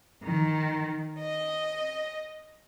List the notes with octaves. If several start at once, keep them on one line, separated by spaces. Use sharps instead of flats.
D#3
D#5